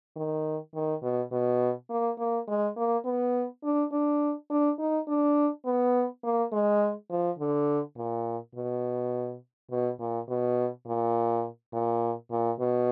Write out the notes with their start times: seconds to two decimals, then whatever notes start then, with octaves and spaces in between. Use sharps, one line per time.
0.16 D#3
0.74 D#3
1.02 B2
1.32 B2
1.89 A#3
2.18 A#3
2.48 G#3
2.77 A#3
3.05 B3
3.63 D4
3.92 D4
4.50 D4
4.79 D#4
5.08 D4
5.65 B3
6.23 A#3
6.52 G#3
7.10 F3
7.39 D3
7.96 A#2
8.55 B2
9.71 B2
9.99 A#2
10.28 B2
10.86 A#2
11.73 A#2
12.31 A#2
12.59 B2